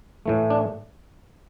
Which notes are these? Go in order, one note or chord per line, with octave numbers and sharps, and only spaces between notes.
A2 E3 A3
D4